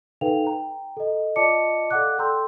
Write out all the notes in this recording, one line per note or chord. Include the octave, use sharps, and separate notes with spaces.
D#4 A4 B4 F5 G5 F7
G5 A#5
A4 D#5
F4 D5 D#5 A5 D6 C#7
A4 D5 F5 F#5 D6 F#6
A4 G5 A#5 C6 E6 G6